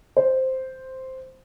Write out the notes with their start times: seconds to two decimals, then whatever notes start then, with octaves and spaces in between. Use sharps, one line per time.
0.17 C5